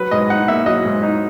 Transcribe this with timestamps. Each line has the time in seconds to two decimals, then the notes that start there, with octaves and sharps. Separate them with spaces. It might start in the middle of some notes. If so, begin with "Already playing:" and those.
Already playing: F#3 B4
0.11 G#2 D#5
0.30 D#4 F#5
0.48 A#3 E5
0.66 F#3 D#5
0.85 G#2
1.03 D#4